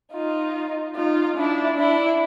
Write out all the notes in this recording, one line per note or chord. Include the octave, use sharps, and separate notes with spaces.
D#4 F4
D#4 F4
D4 E4
D4 E4